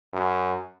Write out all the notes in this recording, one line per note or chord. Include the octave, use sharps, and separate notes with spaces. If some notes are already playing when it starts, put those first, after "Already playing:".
F#2